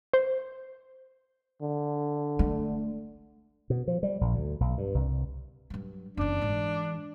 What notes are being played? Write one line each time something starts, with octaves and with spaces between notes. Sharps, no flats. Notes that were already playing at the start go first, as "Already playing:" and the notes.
C5
D3
A3
B2
F3
G3
A#1
D2
B1
G2
C2
G2 F#3
F#1 E2 D4
G#2 E3